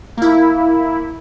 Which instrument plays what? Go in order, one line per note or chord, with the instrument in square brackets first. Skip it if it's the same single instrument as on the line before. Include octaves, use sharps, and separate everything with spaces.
[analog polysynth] A#3 E4